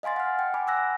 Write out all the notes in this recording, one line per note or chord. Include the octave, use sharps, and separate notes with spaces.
D#5 F5 G#5 C6 A6
F#5 F6
G5
F#5 G#5 B5 D6
G#5 E6 F#6 A#6